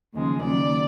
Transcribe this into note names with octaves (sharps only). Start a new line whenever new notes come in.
D#2 C#3 F3 G#3
D#2 C#3 F#3 D5